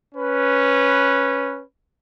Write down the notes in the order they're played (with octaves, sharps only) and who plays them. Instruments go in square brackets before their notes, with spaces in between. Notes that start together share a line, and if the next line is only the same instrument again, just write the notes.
[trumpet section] C#4 B4